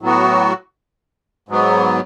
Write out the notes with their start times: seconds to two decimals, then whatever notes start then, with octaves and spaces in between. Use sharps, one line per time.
0.01 A2 F#3 B3 F#4
1.49 G#2 F#3 B3